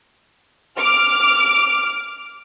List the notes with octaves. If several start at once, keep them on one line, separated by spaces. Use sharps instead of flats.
D6 F6